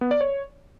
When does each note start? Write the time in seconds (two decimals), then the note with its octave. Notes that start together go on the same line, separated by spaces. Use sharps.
0.01 B3
0.11 D5
0.21 C#5